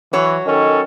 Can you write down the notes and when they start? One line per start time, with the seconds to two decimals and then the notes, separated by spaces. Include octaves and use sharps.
0.13 E3 F#3 C#5
0.46 D#3 C#4 A4